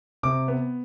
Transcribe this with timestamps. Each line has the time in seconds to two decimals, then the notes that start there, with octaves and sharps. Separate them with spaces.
0.23 C3 D6
0.48 B3